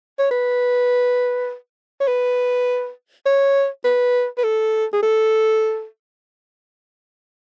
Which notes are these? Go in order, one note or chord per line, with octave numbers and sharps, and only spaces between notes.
C#5
B4
C#5
B4
C#5
B4
B4
A4
G#4
A4